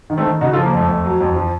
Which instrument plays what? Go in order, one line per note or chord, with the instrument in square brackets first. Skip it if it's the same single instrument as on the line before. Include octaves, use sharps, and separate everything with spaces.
[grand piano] D#3
A3 C4
D#3
C#3 D#4 F#4
F4 A4
F3
A#3
F2 A3
F2
F#3
F2
F3